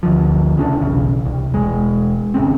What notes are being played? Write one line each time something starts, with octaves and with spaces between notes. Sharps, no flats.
D2 D3 F3
C2 C#3 C#4 D4
B1 E2 C#3
C2
E1 G#3
G#1 C#3 C4